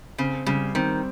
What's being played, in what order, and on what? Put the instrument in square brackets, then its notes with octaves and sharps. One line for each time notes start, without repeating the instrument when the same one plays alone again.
[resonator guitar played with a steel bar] C#3 [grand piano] C4
[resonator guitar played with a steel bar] C#3 [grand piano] G3
[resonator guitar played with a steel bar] D#3 [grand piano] C4